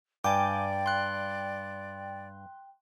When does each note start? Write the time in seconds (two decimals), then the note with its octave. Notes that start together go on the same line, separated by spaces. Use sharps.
0.24 G2 D5 G5 G#5 D6
0.86 C6 F#6